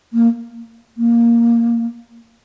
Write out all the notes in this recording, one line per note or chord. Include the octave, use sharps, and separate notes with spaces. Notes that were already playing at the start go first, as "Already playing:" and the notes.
A#3
A#3